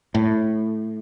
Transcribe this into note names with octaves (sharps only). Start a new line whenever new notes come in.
A2